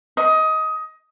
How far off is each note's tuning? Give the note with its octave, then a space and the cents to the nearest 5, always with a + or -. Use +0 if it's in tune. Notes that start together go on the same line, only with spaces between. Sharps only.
D#5 +20